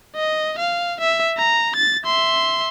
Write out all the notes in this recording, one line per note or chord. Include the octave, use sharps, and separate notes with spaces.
D#5
F5
E5
A#5
A6
E5 C6